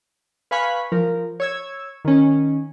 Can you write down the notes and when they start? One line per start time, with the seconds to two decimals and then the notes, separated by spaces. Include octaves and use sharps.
0.51 B4 F5 G#5 B5 C#6
0.92 F3 A#4
1.40 C#5 E6 G#6
2.05 D#3 C#4